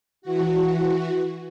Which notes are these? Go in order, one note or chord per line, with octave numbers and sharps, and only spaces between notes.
E3 F#4